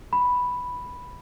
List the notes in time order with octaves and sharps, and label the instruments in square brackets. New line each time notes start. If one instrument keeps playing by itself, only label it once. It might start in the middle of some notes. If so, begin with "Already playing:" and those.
[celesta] B5